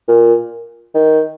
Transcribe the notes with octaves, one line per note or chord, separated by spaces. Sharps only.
A#2
D#3